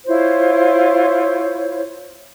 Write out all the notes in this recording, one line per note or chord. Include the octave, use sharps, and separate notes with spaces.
E4 F4 C5 C#5